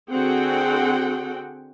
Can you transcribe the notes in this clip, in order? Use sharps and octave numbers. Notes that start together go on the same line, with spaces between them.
D3 C4 F#4 G#4 F#5 G5